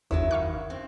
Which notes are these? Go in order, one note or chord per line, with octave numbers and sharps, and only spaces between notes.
G1 E2 D#3 F#3 E4
F5 C#6 F#6
C4